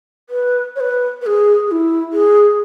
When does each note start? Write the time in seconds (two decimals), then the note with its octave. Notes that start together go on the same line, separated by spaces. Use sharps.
0.30 B4
0.76 C#5
0.80 B4
1.22 B4
1.26 G#4
1.67 G#4
1.71 E4
2.13 G#4